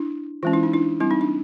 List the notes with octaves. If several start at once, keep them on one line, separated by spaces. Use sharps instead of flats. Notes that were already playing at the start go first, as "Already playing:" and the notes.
Already playing: D4 E4
E3 G#3 C#4 F4
E4
D#4
D4 E4
G3 C4 E4
D#4
D4